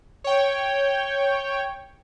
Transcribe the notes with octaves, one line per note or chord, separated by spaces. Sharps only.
C#5 G5